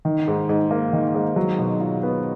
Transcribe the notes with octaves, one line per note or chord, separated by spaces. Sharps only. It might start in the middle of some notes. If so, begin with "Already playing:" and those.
D#3
G#2
G#2
A#3
D#3
G#2
F#3
B2
F4
B3